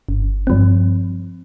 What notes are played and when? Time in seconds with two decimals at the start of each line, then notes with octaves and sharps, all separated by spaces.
0.09 G1
0.47 G2 F3 C4